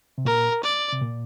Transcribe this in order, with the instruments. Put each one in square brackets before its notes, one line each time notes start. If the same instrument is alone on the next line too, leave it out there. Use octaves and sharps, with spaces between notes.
[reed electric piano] C3
[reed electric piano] A#2 [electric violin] A#4
[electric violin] D5
[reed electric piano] C3
A#2